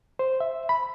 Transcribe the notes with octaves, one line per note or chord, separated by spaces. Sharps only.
C5
E5
B5